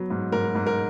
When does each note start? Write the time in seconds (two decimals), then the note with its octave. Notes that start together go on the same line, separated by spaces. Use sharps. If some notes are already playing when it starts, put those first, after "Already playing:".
Already playing: F#3 B3
0.10 G#2
0.32 G#2 A#4
0.55 G#2
0.67 A#4